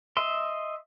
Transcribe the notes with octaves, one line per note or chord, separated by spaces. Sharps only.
D#5 E5 C6